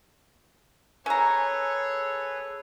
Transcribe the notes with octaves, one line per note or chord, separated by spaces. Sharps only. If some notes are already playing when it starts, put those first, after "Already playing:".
C#4 G#4 A4 B4 C#5 A#5